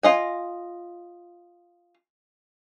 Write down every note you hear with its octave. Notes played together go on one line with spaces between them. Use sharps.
F4 D#5 G#5